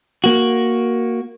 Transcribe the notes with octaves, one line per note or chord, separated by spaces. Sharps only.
A#3 F#4